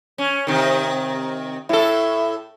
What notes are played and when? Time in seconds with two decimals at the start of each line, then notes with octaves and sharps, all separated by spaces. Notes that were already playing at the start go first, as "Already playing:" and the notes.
0.18 C#4
0.47 C3 D#3
1.69 A2 E4 A4